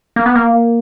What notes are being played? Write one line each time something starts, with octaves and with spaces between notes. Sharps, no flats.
A#3
B3
A#3